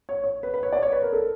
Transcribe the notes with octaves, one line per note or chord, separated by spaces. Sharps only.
C#5
C#5
B4
B4
C#5
D5
C#5
B4
A#4
A4